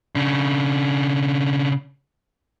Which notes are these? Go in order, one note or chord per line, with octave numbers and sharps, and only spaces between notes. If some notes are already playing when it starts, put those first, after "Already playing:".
C#3 D4